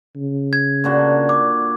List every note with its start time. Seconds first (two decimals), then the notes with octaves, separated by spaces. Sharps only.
0.16 C#3
0.53 G#6
0.84 A#2 D3 F#4
1.29 D6